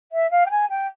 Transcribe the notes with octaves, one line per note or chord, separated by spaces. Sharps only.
E5
F5
G5
G#5
G5